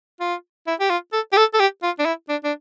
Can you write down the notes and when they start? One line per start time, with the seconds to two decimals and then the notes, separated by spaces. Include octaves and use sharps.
0.20 F4
0.67 E4
0.80 G4
0.90 F4
1.13 A4
1.32 G4
1.37 A4
1.54 A4
1.59 G4
1.83 F4
1.99 D4
2.05 E4
2.29 D4
2.44 D4